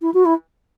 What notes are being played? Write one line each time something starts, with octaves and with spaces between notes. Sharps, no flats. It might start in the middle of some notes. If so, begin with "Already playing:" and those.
E4
F#4
E4